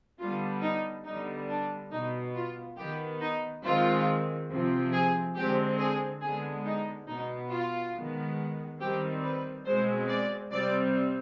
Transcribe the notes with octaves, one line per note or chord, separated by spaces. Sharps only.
D3 G3 B3 F4
D#4
D3 G3 B3 D#4
D4
B2 B3 D#4
F4
D#3 B3 G4
D#4
D#3 G#3 C4 F4
C3 F3 C4
G#4
D3 G#3 C4 G4
G#4
D3 G#3 B3 G#4
D#4
B2 B3 D#4
F4
D#3 G#3 B3
D#3 G3 C4 G4
B4
B2 G#3 C4 C5
D5
C3 G3 C4 D5